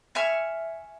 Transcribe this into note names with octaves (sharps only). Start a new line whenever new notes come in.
E5 G#5 C#6 F6